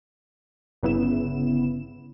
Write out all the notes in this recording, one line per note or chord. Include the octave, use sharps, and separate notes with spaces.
G1 C#3 B3 E4 E7